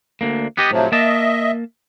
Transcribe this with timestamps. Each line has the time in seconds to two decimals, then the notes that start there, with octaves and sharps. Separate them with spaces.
0.21 D2 D3 A#3
0.57 B3 G4 D#5
0.71 A2 C3 F3 F#3
0.92 A#3 D#5 E5 A5